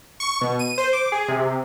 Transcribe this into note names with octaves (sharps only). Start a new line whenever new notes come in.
C#6
B2
D#7
C5
D6
G#4
C3